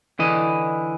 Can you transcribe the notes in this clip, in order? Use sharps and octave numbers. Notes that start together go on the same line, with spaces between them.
D3 E3 D#5